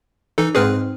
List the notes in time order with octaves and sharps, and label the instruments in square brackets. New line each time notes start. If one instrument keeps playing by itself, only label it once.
[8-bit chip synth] E3 D#4 A4
[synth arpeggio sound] G#2 C4 [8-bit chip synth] G#4 B4 F6